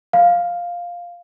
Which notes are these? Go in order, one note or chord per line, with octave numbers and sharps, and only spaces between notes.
F5